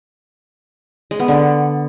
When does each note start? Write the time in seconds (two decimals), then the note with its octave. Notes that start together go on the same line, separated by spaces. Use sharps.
1.11 G#3
1.20 B3
1.28 D3